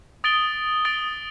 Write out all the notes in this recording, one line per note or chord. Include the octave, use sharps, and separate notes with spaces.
D#6 A6 D7 G7
D#6 A6 D7 G7